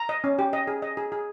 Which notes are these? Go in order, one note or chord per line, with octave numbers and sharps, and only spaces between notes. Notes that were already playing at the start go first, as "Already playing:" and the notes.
Already playing: A#5
D#5
C#4
G4
D#5
G#4
D#5
G#4
G#4